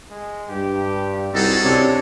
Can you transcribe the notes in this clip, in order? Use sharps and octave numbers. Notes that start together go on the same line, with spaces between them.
G#3
G2 G4
C2 G3 G#3 D#4 F#4 A4
C#2 C3 D4 C#5